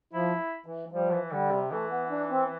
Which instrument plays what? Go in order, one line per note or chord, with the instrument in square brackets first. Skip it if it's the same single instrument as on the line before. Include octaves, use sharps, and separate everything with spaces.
[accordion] F3 [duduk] E4
[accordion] E3
[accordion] F3 [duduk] G3
[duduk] E3
[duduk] D3 [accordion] G3
[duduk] C3
[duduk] E3 [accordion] A3
[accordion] B3
D4
C4